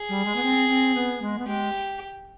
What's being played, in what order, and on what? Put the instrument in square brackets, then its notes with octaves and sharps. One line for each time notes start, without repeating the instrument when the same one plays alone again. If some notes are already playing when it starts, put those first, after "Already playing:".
Already playing: [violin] G#4
[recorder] G3
G#3
B3
C4
C4
B3
G#3
B3
[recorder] G#3 [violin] G4